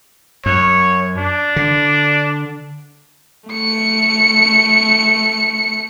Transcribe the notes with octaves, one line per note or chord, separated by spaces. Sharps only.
F#2 C#5
D4
D3
A3 C#7